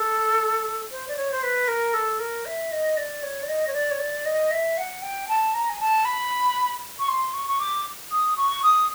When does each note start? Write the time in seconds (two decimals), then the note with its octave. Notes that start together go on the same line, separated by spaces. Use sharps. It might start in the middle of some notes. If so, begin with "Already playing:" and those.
Already playing: A4
0.91 C5
1.08 D5
1.17 C#5
1.32 C5
1.43 B4
1.68 A#4
1.94 A4
2.19 A#4
2.45 E5
2.72 D#5
2.97 D5
3.23 C#5
3.43 D5
3.48 D#5
3.67 C#5
3.73 D5
3.91 C#5
3.99 D5
4.26 D#5
4.51 E5
4.77 F#5
5.02 G5
5.28 A5
5.54 A#5
5.69 G#5
5.80 A5
6.05 B5
6.99 C#6
7.08 C6
7.34 C#6
7.48 C#6
7.59 D6
8.11 D#6
8.37 C#6
8.63 D#6